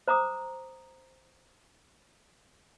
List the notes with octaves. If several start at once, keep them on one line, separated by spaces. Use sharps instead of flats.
C5 A#5 D6 D#6